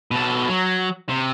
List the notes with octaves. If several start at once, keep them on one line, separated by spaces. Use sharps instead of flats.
B2 A4
F#3
C3